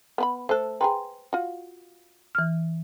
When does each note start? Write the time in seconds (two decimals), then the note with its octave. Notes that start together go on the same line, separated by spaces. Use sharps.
0.18 B3 B4 B5
0.49 A3 A4 C5 F#6
0.81 G#4 A4 B4 G5 A#5 C6
1.33 F4 F#4
2.35 E3 F6